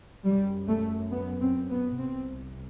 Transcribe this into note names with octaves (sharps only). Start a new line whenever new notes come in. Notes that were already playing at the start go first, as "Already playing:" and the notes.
F#2 G3
A3
B3
C4
B3
C2 C3 C4